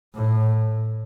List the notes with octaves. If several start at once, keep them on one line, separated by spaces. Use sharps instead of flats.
A2